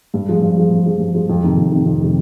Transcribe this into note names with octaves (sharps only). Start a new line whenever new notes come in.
G2
F3 G#3
G2
F3 G#3
G2
F3 G#3
G2
F3 G#3
F2
C3 D#3
F2
C3 D#3
F2
C3 D#3